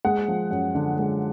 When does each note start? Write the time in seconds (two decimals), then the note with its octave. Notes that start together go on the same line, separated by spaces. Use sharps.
0.05 G#3 F#5
0.28 F3
0.51 F#2
0.75 D3
0.99 G#3